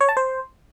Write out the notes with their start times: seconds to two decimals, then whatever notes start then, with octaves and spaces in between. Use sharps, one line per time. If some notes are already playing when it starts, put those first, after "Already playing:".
0.01 C#5
0.09 A5
0.17 C5